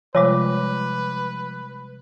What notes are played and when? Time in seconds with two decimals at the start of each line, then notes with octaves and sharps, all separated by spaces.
0.15 C3 F3 G3 G#3 B4 C#5 D6